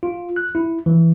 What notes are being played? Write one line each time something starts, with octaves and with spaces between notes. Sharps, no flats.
F4
F#6
E4
E3